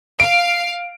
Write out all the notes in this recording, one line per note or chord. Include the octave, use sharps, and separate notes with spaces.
F5 D7